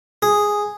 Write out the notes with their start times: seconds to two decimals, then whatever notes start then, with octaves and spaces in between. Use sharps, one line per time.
0.22 G#4